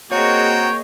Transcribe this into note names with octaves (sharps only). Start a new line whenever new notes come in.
A#3 C4 F#4 G#4 A#4 C#5 D#5 G5